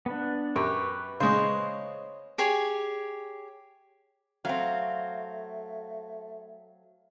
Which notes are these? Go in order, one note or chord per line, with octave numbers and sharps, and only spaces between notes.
B3 D4
F#2 G4 B4 C#6
C#3 G#3 C5 C#5 D#5
G4 G#4 C#5
F#3 A3 C4 F5